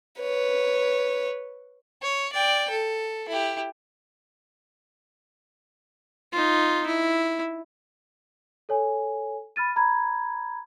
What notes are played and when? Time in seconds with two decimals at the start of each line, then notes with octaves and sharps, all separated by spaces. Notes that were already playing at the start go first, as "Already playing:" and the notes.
0.20 B4 C#5
2.02 C#5
2.32 D5 G5
2.70 A4
3.28 E4 G4
6.32 D#4 F4
6.87 E4
8.69 A4 C#5 G#5
9.56 B5 F6 A6 D#7
9.76 A#5 B5 G#6